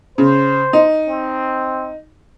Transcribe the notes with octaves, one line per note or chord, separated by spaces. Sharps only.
C#3 C5
D#4
C4